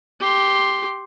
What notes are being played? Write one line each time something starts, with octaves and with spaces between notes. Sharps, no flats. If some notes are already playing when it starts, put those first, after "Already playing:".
G4 C6